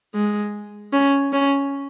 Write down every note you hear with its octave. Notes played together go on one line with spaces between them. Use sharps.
G#3
C#4
C#4